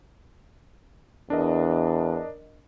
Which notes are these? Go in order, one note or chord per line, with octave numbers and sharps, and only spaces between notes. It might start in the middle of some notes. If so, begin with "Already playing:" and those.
E2 D4 A#4 D#5